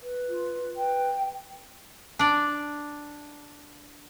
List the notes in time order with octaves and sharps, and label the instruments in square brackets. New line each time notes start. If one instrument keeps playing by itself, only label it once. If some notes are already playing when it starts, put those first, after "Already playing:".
[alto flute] B4
[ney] F4
[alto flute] B4 [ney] G5
[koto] D4 D5